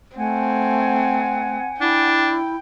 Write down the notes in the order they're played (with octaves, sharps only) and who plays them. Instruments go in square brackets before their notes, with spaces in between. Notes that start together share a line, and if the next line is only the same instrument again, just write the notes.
[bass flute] A3 [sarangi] C4 [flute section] F#5 G#5
[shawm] D4 [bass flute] E4 [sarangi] G5